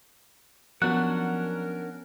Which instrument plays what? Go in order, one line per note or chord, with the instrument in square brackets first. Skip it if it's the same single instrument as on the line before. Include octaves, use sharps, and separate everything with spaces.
[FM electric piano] F3 B3 [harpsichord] F#3 [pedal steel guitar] C#4 D4 F#5 [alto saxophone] A#4